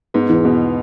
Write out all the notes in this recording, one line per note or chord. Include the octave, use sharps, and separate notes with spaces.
G#2 B3
E2
B2 B3